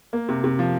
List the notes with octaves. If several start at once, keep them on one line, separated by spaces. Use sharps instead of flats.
A#3
C3
C3
F3